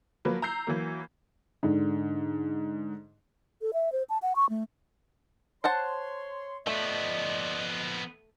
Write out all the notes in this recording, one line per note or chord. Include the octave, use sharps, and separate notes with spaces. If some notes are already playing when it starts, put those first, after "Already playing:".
F3 F#3 A#3 B4
A#5 E6 G6 C7
E3 F#3 A#3
G#2 D3
A4
E5
C5
A5
F#5
C#6
A3
C5 C#5 F#5 A5 C6
F3 A3 B3 D5 D#5